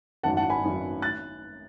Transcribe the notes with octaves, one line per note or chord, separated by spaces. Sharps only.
G#1 F#2 D#3 F#3 F#5 A5
F#5 A5
G#5 B5
G#1 F#2 D#3 F#3
F#6 A6